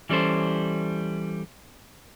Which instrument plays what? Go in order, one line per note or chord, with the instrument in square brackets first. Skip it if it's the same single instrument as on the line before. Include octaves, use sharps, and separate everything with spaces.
[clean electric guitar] E3 G3 C#4 A4 C5